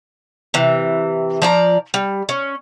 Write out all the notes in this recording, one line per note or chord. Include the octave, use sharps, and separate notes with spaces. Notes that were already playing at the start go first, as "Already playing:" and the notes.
C3 E3
F3 D5 A#5
G3
C#4